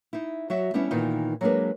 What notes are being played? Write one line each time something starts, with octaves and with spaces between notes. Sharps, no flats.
D#4 E4
F#3 F#4 E5
G3 B3 C#4 D4 E4
A#2 D#3 E3 B3 D#4 F4
F#3 G#3 A#3 D4 G#4 B4